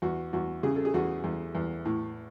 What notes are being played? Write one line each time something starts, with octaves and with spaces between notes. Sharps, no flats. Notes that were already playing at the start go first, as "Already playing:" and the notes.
E2 F#4
E2 F#4
C#3 G#4
A4
G#4
E2 F#4
E2
E2
A2